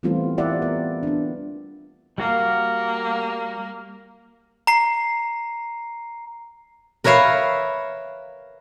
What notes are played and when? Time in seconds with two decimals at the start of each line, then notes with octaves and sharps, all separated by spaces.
0.03 E3 G3 A3 B3 C4 F4
0.38 E4 G4 A#4 D5 E5 F#5
0.62 B3 A#4
1.03 B3 D4
2.18 G3 A#3 F#4 F5
4.67 A#5 C7
7.04 A#4 B4 C#5 E5 F5